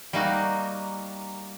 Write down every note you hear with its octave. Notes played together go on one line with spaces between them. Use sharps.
G3 A#3 D#4 F#4